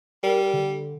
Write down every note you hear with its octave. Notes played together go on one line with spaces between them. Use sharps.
G3 A#4
D3